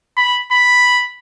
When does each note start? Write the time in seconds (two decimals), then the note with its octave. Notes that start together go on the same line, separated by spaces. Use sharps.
0.17 B5
0.52 B5